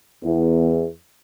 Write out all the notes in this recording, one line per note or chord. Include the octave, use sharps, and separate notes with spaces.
E2